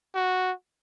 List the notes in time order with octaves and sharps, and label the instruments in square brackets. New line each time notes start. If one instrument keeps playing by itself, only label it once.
[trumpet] F#4